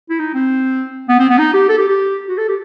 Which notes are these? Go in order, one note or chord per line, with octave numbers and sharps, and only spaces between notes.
E4
D#4
C4
B3
C4
B3
D#4
G4
A4
G4
G4
F#4
A4
G4